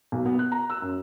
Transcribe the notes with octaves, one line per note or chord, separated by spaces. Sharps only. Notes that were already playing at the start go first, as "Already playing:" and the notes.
B1
B3
F#6
A#5
E6
F#2